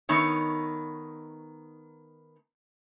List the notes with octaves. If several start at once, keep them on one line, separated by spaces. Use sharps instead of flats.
D#3 A3 B3 D#4 C#5